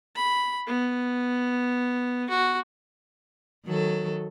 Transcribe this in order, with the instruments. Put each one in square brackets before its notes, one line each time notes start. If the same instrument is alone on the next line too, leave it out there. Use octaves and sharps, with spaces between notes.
[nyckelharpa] B5
B3
F#4
[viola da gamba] D#3 F#3 A4